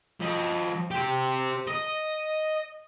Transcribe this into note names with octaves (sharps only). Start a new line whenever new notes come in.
F3 D#5
G4 C5
D#5